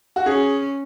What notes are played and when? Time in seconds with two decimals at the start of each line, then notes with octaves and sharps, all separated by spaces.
0.16 F#4
0.26 C#4 G#4